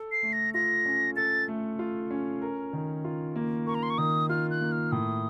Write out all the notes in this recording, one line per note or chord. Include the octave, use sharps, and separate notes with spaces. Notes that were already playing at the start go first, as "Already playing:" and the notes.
Already playing: A4
C7
A3
A#6
F4 A#6
C#4
A4 A6
A3
F4
C#4
A#4
D#3
F4
A#3
A#4 C#6
A#5
C6
C#6
D#3 D#6
F4 F6
F#6
A#3
F6
A2 D#6